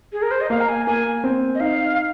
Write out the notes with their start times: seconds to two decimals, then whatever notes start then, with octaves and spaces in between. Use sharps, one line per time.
0.13 G#4
0.22 A#4
0.31 C5
0.41 D#5
0.50 A#3 F5
0.61 A#5
0.69 G#5
0.86 A#3 G#5
1.24 C4
1.55 D#5
1.60 D#4 F5